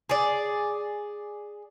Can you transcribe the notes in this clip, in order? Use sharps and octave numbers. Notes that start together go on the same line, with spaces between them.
G#4 D5